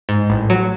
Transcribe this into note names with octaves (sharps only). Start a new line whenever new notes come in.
G#2
A1
F#3